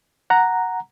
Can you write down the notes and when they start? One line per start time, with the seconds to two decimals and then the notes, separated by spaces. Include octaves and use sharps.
0.30 F#5 A#5